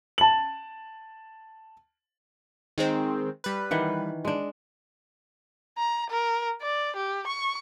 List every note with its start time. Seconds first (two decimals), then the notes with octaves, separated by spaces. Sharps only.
0.18 A5 F#7
2.78 D#3 G#3 C4
3.44 G3 B4
3.71 D#3 E3 F#5
4.25 G#3 D4
5.78 A#5
6.10 A#4
6.62 D5
6.96 G4
7.28 C#6